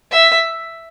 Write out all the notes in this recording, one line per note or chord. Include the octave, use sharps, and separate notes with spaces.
E5